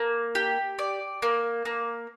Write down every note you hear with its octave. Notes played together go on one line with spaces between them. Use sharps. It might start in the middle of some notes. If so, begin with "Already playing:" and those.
Already playing: A#3
G4
D5
A#3
A#3